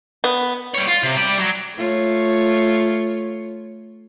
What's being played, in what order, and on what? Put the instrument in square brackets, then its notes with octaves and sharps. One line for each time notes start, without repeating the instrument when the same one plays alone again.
[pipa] B3
[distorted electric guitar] G3 C#5
F4
C3
G4 D5
F#3
[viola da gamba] A3 F4 C#5